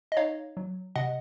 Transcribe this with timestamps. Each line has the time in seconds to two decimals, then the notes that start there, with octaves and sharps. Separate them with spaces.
0.12 D#5
0.17 D#4 C#5 F5
0.57 F#3
0.96 C3 D#5 F#5